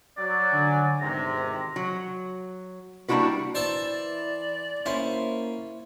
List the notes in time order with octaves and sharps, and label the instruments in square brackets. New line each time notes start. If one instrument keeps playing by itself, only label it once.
[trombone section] F#3 [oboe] D5
[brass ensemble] D3 G#5
[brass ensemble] G#1 E2 [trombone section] C3 [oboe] A#5
[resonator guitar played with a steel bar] F#3
G3 A#3 D4 E4 F#4 B4
[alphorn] E3 [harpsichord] C5 E5 A5 [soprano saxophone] D5
[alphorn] A#3 [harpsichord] C#4 [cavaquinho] E4 C5